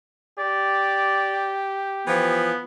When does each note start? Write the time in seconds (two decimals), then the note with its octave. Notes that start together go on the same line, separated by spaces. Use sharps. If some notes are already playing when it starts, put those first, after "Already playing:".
0.39 G4 D5
2.07 E3 F3 B3